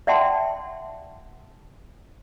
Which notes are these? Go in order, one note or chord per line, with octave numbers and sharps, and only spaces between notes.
D5 E5 F#5 G5 A5 C6